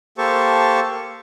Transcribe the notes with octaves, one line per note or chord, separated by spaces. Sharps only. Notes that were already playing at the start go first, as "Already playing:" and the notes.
A#3 G4 A4 C5 A5 C#6